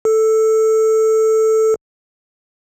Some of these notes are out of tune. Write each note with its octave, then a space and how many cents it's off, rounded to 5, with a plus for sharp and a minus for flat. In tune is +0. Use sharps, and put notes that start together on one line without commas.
A4 +0